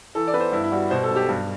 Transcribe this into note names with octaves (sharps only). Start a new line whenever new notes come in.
E3 A4
D5
B3 B4
C5
G2 E4
E4
G3 F#4
B2 C5
A4
B1
G4
G2